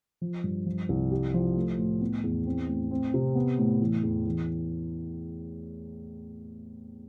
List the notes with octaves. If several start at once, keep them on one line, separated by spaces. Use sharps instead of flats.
F3
G2
F3
C2
G4
F3
A3
A2
B3
E2
C4
A2
C4
C3
B3
A2
E3
E2
E3